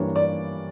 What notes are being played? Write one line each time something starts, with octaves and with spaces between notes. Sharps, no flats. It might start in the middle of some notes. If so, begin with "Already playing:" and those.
Already playing: G2 E3 G3 A#3 D4 C#5
D5